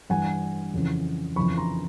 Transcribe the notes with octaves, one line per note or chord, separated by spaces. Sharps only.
G2 E3 F#5 G#5
F2 C#3 E3
F2 C#3 E3 B5 C#6
A#5 C6